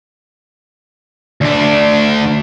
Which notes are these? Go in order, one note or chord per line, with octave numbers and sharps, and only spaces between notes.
D2 D4